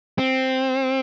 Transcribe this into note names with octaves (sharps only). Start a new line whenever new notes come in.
C4